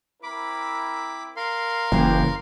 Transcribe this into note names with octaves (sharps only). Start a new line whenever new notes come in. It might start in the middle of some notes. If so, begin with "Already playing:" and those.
C4 E4 A#4 B5 D6
A#4 F5 C6
F#1 C#3 E3 A#3 G4 G5